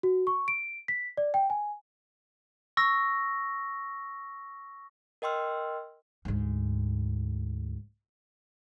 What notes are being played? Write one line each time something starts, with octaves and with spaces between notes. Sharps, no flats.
F#4
C#6
D7
B6
D5
G5
G#5
C#6 E6 A#6
A#4 D#5 G5 C6 E6 F6
D2 G#2